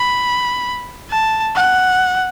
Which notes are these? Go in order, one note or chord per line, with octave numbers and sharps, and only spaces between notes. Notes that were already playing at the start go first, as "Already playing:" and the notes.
Already playing: B5
A5
F#5